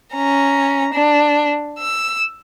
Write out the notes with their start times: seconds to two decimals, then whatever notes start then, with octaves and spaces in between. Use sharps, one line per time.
0.15 C#4 A#5
0.94 D4
1.79 E6